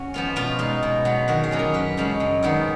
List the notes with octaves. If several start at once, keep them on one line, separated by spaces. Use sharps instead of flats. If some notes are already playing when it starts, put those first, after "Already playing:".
Already playing: C#4 F#4
F3 B3 F4
B2 F4
G#3 D#4
B2
F#3 B3
D#3 F#4
G#4
F#3 A#3 C#4 F4
A#4
F#2 B4
C#3 F3 G#3 C#4
F#2
D#3 G#3 B3 D#4